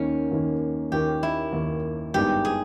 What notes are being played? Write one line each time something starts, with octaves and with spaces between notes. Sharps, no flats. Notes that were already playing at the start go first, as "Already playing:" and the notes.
Already playing: D#2 D#3 A#3 C#4
D#2 D#3 A#3
D#2 D#3 A#3 G4
E4
D#2 D#3 A#3
G#1 G2 D#3 G#3 B3 G4
G#4